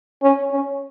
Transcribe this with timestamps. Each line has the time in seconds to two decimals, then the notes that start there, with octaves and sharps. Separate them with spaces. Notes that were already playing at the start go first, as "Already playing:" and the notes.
0.22 C#4
0.52 C#4